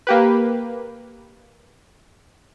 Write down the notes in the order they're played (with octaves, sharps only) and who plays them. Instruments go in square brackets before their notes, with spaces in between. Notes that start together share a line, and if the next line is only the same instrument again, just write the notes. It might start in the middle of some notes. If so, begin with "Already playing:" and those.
[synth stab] A#3 G4 B4